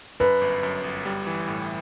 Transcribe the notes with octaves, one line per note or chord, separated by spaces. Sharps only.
F#2 B4
G1
F#2
G1
G3
E3
A2